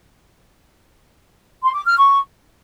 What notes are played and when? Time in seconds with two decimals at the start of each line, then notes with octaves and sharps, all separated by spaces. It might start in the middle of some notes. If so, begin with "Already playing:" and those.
1.64 C6
1.75 D6
1.86 F6
1.97 C#6